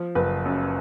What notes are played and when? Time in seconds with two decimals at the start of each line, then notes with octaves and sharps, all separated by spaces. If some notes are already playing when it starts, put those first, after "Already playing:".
Already playing: F3
0.15 F#1 B4
0.45 F#2